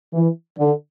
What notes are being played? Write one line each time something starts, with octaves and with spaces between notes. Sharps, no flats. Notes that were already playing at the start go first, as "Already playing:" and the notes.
E3
D3